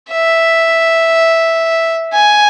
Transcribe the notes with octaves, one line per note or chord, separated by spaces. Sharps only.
E5
G#5